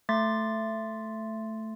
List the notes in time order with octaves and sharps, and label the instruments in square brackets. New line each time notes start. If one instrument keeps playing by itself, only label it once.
[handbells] A3 C6 A6 B6